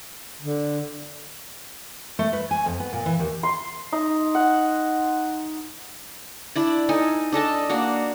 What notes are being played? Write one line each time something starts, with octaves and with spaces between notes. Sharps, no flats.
D3
A3
B4
G#5
F2
B3
A#2
E3
D#2
C6
D#4
F#5
D4 E4 D5
D#4 A4 G#5
D4 A4 D#5 A5
A#3 D4 F#4